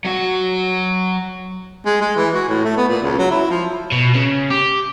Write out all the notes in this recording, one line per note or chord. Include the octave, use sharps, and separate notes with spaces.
F#3 F#4
G#3
G#3
E3
F#4
A2
A3
B3
A#2
C#2
F#3
E4
F3
B2
C#3
G4